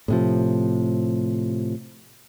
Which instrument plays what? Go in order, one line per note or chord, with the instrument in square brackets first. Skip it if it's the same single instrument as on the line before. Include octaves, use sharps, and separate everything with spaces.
[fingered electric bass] A2 C3 F3